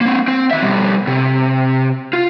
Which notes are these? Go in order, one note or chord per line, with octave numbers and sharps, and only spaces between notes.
A#3 C4
C4
D#3 E5
B2 G3
C3
F4